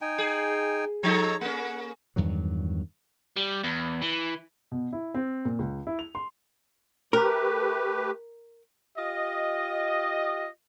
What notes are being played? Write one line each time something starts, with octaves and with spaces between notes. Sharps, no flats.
D#4 G5 G#5
G#4
F3 D#4 A4 C#5 A#5
A#3 C#4 F#5
E2 G2 D#3 F#3
G3
E2
E3
B2
E4
C4
A#2
C#2
E4
F7
C6
A3 G4 A#4 B4
F4 G4 D#5